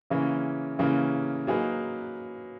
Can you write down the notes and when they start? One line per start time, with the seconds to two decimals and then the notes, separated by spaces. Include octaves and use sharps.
0.10 C#3 E3 A#3 C#4
0.79 C#3 E3 A#3 C#4
1.47 F#3 A#3 D#4 G#4 B4